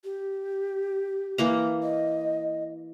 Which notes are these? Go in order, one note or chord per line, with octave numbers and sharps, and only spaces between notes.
G4
E3 A#3 A#5
D#5